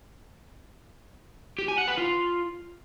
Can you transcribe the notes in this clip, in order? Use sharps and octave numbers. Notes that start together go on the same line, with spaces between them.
G4
G#5
F#5
B4
F4